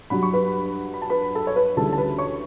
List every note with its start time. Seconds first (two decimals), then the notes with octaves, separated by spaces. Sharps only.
0.10 G2 F#3 B5
0.23 C#6
0.34 B4 B5
0.94 B5
1.02 A5
1.10 B4 B5
1.35 A4 A5
1.47 C#5
1.56 B4
1.77 D2 C#3 E3 G3 A4 A5
1.93 A5
1.98 B4 B5
2.18 C#5 C#6